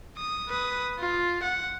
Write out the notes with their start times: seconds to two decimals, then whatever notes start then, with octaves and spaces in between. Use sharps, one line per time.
0.17 D#6
0.49 B4 D#6
0.99 F4
1.43 F#5